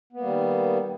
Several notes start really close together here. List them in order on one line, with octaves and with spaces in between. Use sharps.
B3 A#3 G3 D#3